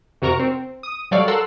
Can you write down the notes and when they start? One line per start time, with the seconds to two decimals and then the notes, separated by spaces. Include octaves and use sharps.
0.22 F2 C3 F#4 A#4 A#5 C#6
0.39 C4
0.83 D#6
1.11 F#3 G3 A4 C#5 D5 F5
1.28 A4 A#4 F#5 C6 E6